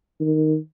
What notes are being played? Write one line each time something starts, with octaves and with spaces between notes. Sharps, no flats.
D#3